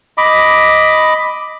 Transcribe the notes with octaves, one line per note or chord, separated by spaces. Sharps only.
D#5 B5 D6